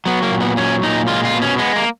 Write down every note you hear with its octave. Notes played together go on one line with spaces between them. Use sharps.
F#3 B3
A#3
A#2
B3
F#3 C#4
A#2 D#4
G#3 F4
F4
B2
C#4
G#3 B3
A#3